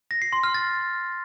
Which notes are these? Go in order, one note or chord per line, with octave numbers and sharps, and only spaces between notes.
A#6
C7
C6
F6
A6